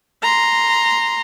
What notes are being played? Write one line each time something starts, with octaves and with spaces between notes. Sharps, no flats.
A#5 C6